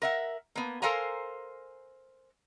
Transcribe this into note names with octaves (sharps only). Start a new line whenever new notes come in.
A#4 E5 F#5
A#3 B3
A4 A#4 C5 F5 G#5 A#5